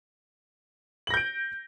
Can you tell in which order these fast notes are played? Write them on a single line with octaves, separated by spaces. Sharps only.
F#7 A#6 G6 D7